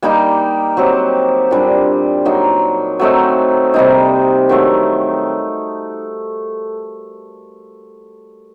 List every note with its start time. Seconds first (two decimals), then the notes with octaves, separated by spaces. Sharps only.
0.02 G3 A#3 D#4 G4
0.77 F#3 C4 G4
1.51 A#2 G3 D4
2.25 F#3 A#3 D#4
2.99 F#3 A3 C4 D#4
3.74 C3 G3 A#3 D#4
4.49 D#3 F#3 A3